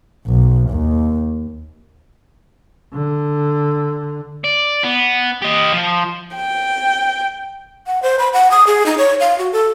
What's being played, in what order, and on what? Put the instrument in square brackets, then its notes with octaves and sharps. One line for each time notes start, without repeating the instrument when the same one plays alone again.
[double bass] B1
D#2
D3
[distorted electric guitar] D5
B3
G4 D#5
F3
[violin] G5
[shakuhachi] F#5
C5
B5
F#5
D#6
G#4
D#4
C#5
F5
F#4
A4